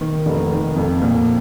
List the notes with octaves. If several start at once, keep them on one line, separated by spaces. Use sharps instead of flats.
D#3
F1
D#3
F2
A#2